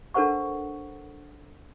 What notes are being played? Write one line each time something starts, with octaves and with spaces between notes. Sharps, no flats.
D4 A4 A#4 C5 F#5 C#6